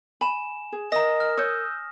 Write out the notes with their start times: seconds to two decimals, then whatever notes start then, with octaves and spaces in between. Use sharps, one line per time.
0.21 G#5 B5 E7
0.72 G#4
0.92 A#4 D#5 E5 A#5 D#6 A#6
1.20 F6
1.38 C#5 D#6 E6 G6